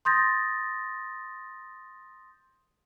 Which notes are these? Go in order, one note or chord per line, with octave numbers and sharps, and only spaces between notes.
C6 D#6 G6 A6 A#6